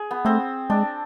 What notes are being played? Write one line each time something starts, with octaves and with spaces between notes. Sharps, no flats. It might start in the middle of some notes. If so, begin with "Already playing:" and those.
Already playing: G#4
B3
A3 C4
G#3 D4